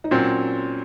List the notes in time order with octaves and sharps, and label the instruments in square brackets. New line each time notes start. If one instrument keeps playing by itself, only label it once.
[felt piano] D#4
[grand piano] A#2 F#3 C4 [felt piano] C#4